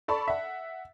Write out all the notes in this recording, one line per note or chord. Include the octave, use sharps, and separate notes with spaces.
A4 D5 A5 B5 C#6
E5 F#5